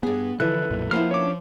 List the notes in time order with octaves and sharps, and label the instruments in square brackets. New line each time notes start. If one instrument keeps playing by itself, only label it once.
[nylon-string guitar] G2 G#4 [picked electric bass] B3
[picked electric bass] D3 E3 F3 [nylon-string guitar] E4 [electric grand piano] A4 B4 [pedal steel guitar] F#6
[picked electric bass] B1 F#2 A#2
[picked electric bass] F3 [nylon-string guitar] A#3 B3 E4 [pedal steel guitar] C5 F6
[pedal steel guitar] C#4 D4 [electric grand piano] C#5 D6